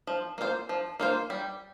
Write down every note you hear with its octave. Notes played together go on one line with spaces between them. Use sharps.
F3
A#3 F4 C5
F3
A#3 F4 C5
G3